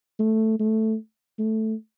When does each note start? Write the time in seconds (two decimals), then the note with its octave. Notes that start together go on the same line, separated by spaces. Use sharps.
0.19 A3
0.59 A3
1.39 A3